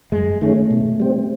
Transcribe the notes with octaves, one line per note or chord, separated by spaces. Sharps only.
F#2 G#3
D#3 G#3 A3 C#4
B2
G3 C4